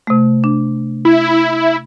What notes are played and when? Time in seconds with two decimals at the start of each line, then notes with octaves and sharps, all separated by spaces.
0.07 C3 A3
0.44 D4
1.05 E4